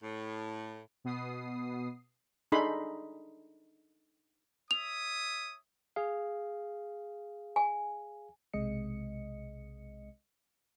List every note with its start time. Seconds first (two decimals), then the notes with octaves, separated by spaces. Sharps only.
0.01 A2
1.04 B2 B3 D#6 C7
2.52 D4 D#4 G#4 A4 B5 C6
4.71 C#5 E5 D#6 F7
5.96 G#4 F5
7.56 G#5
8.53 B1 C3 G#3 D#5 C#7